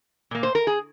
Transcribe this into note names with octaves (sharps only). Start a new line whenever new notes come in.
A#2 A#3
C5
A#4
G#4